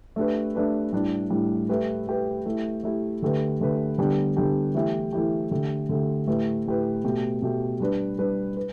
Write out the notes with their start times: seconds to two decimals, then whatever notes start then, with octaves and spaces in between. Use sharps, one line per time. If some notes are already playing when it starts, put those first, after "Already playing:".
0.16 A3 D4 G4 B4
0.55 A3 D4 G4 B4
0.92 A2 G3 D4
1.30 A2 G3 D4
1.69 A3 G4 B4
2.07 A3 G4 B4
2.46 A3 E4 G4
2.84 A3 E4 G4
3.22 D3 A3 G4 B4
3.61 D3 A3 G4 B4
3.98 D3 G3 B3 D4 G4
4.37 D3 G3 B3 D4 G4
4.74 E3 A3 E4 G4
5.13 E3 A3 E4 G4
5.51 D3 A3 G4
5.89 D3 A3 G4
6.27 A2 A3 G4 B4
6.66 A2 A3 G4 B4
7.04 B2 A3 G4
7.42 B2 A3 G4
7.80 G3 D4 B4
8.18 G3 D4 B4
8.57 B4